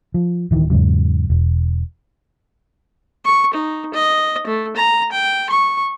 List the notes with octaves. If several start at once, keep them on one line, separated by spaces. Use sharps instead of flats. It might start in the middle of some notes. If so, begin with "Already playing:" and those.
F3
D1 D#3 E3
E2 G#2 C#3 F#3
E1
C#6
D#4
D#5
A3
A#5
G5
C#6